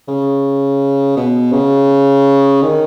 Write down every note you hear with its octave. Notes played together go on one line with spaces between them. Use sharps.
C#3
B2
C#3
D#3